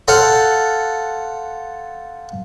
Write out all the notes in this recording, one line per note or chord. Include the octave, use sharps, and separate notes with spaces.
A4 C5 F5 F#5